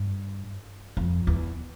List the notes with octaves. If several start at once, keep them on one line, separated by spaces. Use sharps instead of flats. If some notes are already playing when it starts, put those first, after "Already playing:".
Already playing: G2
F2
E2